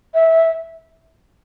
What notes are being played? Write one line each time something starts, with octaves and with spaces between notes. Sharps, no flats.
E5